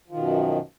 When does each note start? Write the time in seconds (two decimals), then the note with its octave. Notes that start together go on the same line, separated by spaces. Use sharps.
0.08 F3
0.12 D#3
0.15 B2
0.19 F#2